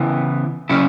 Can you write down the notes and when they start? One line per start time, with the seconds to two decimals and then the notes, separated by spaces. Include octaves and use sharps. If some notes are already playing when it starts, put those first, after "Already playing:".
Already playing: C#3 E3 B3 E4
0.69 C#3 F#3 C#4 E4